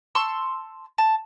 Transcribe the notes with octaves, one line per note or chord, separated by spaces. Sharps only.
A5 C6 C#6 E6
A5